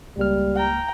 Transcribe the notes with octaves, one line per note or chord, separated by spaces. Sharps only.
C#2 G3 A#3 F6
G5 A#5